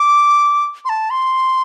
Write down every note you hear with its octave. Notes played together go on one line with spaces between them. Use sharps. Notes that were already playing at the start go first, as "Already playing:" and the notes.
Already playing: D6
C6
A5
C6